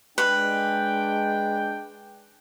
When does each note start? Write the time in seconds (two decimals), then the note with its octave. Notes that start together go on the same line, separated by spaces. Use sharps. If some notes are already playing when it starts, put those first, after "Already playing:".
0.18 G#3 D4 B4 G5